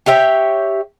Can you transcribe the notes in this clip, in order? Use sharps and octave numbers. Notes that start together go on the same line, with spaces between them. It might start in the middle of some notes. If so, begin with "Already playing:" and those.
G4 C#5 E5 G5